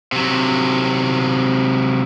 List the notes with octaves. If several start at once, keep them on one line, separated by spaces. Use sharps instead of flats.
C3 F#3